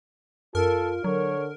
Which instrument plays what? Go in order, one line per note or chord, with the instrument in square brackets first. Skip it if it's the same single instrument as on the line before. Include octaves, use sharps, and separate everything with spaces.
[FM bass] F#2 [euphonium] F4 [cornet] A4 [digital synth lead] A#4
[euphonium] D3 [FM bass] F#3 [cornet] C#5